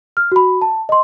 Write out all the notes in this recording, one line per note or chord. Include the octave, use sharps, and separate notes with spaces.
F6
F#4 B5
A5
D#5 C6